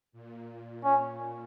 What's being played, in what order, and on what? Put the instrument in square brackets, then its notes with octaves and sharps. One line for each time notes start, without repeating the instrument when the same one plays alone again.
[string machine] A#2
[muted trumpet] C#4